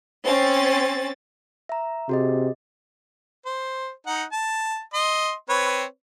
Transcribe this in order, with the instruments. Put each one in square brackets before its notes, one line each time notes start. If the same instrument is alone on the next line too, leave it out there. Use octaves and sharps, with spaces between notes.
[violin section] C4 C#4 A6
[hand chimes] E5 A#5
[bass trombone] C3 [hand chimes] F#4 G#4 D#5
[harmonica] C5
D#4 F#5
A5
D#5 C6
C4 B4 C#5